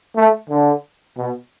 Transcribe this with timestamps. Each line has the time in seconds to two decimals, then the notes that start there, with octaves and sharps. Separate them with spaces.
0.16 A3
0.49 D3
1.17 B2